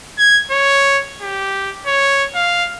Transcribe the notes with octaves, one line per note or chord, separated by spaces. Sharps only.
G#6
C#5
G4
C#5
F5